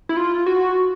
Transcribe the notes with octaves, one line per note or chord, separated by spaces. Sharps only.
E4
F4
F#4